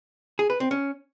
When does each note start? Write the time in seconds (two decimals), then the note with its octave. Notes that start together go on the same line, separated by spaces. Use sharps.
0.39 G#4
0.50 B4
0.60 C4
0.71 C#4